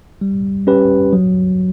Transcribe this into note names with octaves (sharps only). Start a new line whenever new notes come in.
G3
C#4 G4 B4
F#3